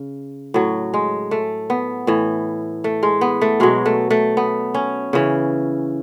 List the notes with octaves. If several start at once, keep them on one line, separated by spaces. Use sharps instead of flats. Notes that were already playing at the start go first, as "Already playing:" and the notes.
Already playing: C#3
A2 F#3
G#3
A3
B3
A2 E3
A3
G#3
B3
A3
B2 F#3 G#3
A3
A3
B3
C#4
C#3 E3